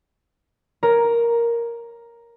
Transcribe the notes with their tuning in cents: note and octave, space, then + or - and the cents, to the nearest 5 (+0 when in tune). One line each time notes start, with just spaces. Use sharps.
A#4 +5 C#5 +0